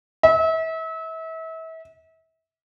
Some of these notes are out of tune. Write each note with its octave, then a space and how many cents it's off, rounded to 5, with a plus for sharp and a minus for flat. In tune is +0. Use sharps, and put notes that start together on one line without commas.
E5 -35